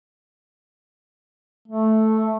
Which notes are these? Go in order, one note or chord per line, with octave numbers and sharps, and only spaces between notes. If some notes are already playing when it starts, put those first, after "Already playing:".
A3